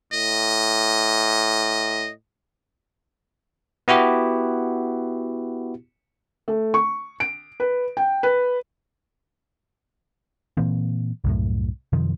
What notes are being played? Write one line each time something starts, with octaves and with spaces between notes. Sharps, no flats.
A2 D#5
B3 E4 F#4 G4
A3
C#6
D7
B4
G5
B4
A#2 E3 A#3 C4
C2 F#2 A2
F#2 C3 D#3 F3